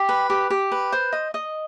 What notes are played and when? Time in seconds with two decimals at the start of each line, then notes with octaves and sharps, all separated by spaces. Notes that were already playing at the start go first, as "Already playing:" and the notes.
Already playing: G4
0.09 B4
0.30 G4
0.50 G4
0.72 B4
0.92 C5
1.13 D#5
1.34 D#5